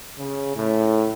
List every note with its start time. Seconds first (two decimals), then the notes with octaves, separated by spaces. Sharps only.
0.17 C#3
0.55 A2